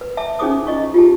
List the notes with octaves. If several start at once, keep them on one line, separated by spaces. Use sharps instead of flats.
B4
E5 A5 D6
C#4 D#4 G#4 C5 D6 D#6
E4 D#5 C#6
F4 G4 G#4 A5